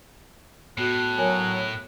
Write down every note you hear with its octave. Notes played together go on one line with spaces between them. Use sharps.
A2 B3 F#4 F#6
F#3 A#4 C#5 G#5